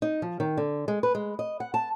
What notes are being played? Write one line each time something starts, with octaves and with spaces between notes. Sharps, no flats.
D#4
F3
D#3
D3
G#3
B4
G#3
D#5
F#5
A5